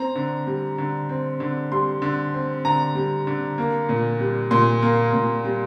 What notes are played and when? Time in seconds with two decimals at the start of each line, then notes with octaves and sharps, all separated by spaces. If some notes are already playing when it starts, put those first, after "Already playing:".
Already playing: C4 A#5
0.15 D3
0.47 G3
0.78 D3
1.09 C4
1.40 D3
1.72 G3 C6
2.02 D3
2.34 C4
2.65 D3 A#5
2.95 G3
3.27 D3
3.58 A#3
3.89 A#2
4.20 G3
4.51 A#2 C6
4.82 A#3
5.13 A#2
5.45 G3